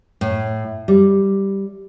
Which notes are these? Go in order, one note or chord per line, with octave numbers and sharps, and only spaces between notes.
A2
G3